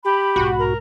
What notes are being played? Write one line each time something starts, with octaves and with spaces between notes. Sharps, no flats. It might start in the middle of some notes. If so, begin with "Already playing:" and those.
G4 B5
B1 G#2 F#4
A#4